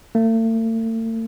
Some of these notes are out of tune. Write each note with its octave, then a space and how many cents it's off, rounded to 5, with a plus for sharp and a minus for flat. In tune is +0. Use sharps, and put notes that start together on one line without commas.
A3 +45